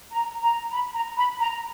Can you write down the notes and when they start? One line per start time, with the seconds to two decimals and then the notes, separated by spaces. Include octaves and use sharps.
0.12 A#5
0.42 A#5
0.72 B5
0.94 A#5
1.17 B5
1.40 A#5